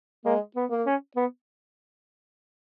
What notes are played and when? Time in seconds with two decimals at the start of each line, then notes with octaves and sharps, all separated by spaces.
0.25 G#3 A#3
0.56 B3
0.70 A#3
0.86 C#4
1.16 B3